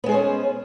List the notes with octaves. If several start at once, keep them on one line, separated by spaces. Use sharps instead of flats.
G#3 B3 C#4 G#4 C5